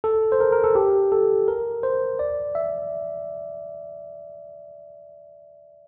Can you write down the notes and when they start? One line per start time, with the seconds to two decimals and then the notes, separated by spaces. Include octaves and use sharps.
0.04 A4
0.32 C5
0.40 A#4
0.52 A#4
0.64 A4
0.75 G4
1.12 A4
1.48 A#4
1.83 C5
2.19 D5
2.55 E5